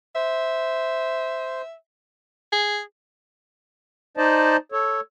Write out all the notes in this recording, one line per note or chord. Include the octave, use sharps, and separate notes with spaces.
C5 E5
G#4
D#4 C5 D5 D#5 A5
A4 C#5